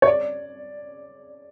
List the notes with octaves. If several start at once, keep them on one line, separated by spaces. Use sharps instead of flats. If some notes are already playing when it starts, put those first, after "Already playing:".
C#5
D5